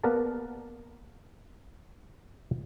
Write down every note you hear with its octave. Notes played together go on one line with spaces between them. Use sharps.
A#3 B3 A#4 B4 D5 A5